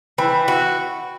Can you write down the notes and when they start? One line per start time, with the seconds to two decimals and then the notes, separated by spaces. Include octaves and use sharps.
0.18 E3 G5 B5
0.48 F#4